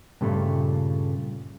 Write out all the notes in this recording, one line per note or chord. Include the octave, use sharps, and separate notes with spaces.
G2 A#2 C#3 A3